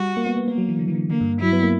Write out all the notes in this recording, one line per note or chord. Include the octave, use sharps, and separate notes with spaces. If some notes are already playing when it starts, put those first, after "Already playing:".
Already playing: G3 F#4
A#3
B3
B3
A#3 B3
F#3
E3
D3
E3
D3
D3 A#3
G2
F#3 E4
B3
A#3